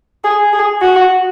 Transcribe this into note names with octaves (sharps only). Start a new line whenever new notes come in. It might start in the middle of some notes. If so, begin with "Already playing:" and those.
G#4
G#4
F#4